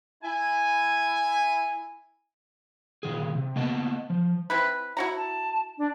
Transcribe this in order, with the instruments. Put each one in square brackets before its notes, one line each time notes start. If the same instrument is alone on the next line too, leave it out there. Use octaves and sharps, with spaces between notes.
[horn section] E4 G#5
[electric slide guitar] A#2 D#3 G#4
C3
A#3 B3 D#5 A5
F3
[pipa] C4 E4 B4
E4 F#4 A#5
[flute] A5
D4